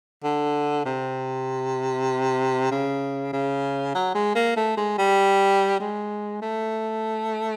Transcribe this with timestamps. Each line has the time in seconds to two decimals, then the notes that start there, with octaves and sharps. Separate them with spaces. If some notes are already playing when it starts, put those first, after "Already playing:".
0.24 D3
0.85 C3
2.71 C#3
3.33 C#3
3.95 F#3
4.15 G#3
4.35 A#3
4.56 A3
4.77 G#3
4.98 G3
5.80 G#3
6.42 A3